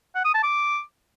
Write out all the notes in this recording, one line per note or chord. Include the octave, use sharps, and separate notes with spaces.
F#5
D#6
A5
D6